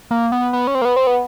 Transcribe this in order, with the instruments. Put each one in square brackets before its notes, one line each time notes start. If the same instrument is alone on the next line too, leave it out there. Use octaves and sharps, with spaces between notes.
[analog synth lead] A#3
B3
B3
C#4
C4
A#3
B3
C4
B3